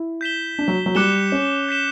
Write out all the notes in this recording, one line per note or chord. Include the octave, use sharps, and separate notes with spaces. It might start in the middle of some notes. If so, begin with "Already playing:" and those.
Already playing: E4
G6 B6 E7 G7
D4
F#3
F#3
G3 D6 F#6 C#7 E7 G7
C#4
G6 B6 E7 G7